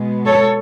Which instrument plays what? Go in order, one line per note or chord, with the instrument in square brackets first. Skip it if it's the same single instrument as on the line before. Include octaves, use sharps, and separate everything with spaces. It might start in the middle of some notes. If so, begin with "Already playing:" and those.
Already playing: [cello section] B2 G#3 B3
A4 C#5